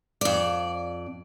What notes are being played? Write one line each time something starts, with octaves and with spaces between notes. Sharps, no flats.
F2 D5